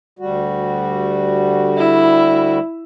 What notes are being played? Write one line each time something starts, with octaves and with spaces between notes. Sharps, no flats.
D2 G3 F#4
E4